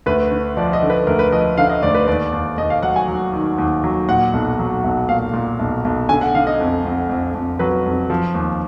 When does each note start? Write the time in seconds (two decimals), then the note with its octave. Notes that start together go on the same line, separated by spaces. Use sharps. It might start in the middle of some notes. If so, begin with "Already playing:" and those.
0.06 D2 B4
0.31 D3
0.57 F3 D5
0.73 D#5
0.83 D3
0.90 B4
1.07 D2 A#4
1.19 B4
1.32 F3 D#5
1.57 D3 F5
1.69 D#5
1.82 D2 D5
1.95 B4
2.07 D#2 D5
2.32 D#2
2.57 D#2 D#5
2.70 F5
2.83 F#3 F#5
2.96 G#5
3.08 F#3
3.33 D#3
3.58 D#2
3.84 F#3
4.09 A#2 F#5
4.33 B1
4.59 F#3
4.84 B1
5.09 A#2 F5
5.33 A#2
5.59 B1
5.85 B1
6.09 D3 G#5
6.21 F#5
6.34 D3 F5
6.47 D#5
6.60 F2
6.84 F2
7.09 F2
7.34 F2
7.59 F#3 B4
7.85 F2
8.10 F3
8.35 D#2